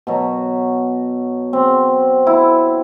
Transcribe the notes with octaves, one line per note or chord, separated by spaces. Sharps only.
B2 F#3
C4
E4